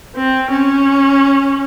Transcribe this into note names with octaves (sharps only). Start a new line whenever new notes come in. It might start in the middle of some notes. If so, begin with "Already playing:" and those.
C4
C#4